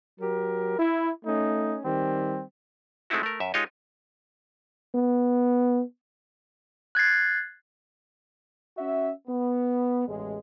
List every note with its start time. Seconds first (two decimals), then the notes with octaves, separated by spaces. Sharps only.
0.20 F#3 G4 A#4
0.77 E4
1.25 A3 C#4 D#4
1.85 D#3 G3 C4
3.10 G#3 A3 C4 D#4 E4 F#4
3.23 A3 A#4
3.40 F#2 E5
3.54 G#3 D#4 F4 G4 C#5 D#5
4.95 B3
6.95 F#6 G#6 A6 C7
8.77 C#4 F#4 E5
9.27 B3
10.08 A1 E2 G#3